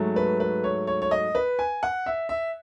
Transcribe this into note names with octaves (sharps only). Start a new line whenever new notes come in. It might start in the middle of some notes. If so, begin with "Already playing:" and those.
Already playing: G#2 F#3 A3
B4
B4
C#5
C#5
C#5
D#5
B4
G#5
F#5
E5
E5